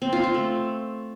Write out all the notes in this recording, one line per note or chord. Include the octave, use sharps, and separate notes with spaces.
C4
F4
F4
A3